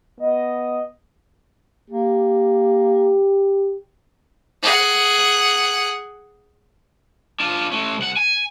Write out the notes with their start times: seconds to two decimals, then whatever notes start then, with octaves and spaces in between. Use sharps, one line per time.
0.19 B3 D#5
1.90 A#3 G4
4.62 G#4 F#5
7.40 D4 F4
7.72 A3 C#4
7.98 C2 F#5
8.17 G#5